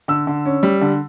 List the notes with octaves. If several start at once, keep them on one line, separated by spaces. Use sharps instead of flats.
D3 E6
D3
C#4
G3
D3